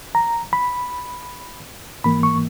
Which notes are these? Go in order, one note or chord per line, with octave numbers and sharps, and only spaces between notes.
A#5
B5
G#2 E3 A#3 B5
C#6